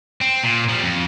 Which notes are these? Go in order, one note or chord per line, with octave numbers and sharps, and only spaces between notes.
C4
A#2
F3 G3
F2